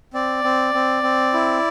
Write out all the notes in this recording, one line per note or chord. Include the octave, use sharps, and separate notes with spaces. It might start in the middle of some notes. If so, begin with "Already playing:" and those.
C4 D5
C4
C4
C4
E4